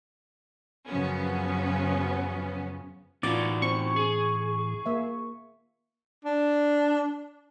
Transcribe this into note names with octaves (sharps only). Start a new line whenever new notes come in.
F#2 C#3 F3 F#3 B3 C#4
A2 E3 B3 C#4 D#4 F4 F#4 D5
C4 C#6
G#4
A#3 E5
D4